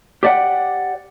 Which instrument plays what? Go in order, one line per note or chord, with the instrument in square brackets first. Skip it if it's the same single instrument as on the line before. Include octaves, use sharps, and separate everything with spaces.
[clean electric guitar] G4 C5 D5 D#5 F#5 G5